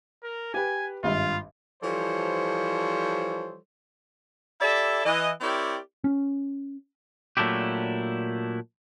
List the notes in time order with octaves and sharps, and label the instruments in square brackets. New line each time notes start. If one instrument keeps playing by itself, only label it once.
[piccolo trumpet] A#4
[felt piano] G4 B4 [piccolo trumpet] G#5
[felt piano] G#1 G2 E5 [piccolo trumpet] F4
[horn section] E3 F3 G3 A4 C5 C#5
E4 G4 A4 D5 E5
E3 D#5
C4 E4 G4 A#4 C#5 D5
[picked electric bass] C#4
[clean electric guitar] A#2 F#3 A3 D4 E4 G4